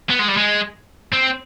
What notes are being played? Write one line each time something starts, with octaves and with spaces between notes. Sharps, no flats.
B3
G#3
G3
G#3
C4